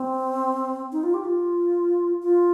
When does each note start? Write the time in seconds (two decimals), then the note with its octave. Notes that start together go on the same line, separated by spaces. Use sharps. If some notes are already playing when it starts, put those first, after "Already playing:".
Already playing: C4
0.92 D#4
1.03 F4
1.14 G4
1.25 F4
2.22 F4